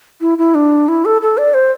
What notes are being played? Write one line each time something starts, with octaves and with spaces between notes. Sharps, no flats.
E4
E4
D4
E4
A4
A4
D5
C5